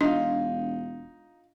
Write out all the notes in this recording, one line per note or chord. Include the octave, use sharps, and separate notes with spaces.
E1 D4 D#4 F4 F5